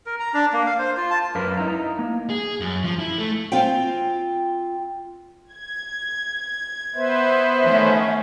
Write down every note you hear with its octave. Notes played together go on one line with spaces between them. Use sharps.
A#4
A#5
D4
A#3
F5
C5
F4
A5
F#2 A#4 B4 F5
D#4 E4 A#5
A#3
G#4
F#2
F3
E4
A3
C4 F4 F5 G5
G#6
B3 B4 C5 E5
D#3 A3 C#4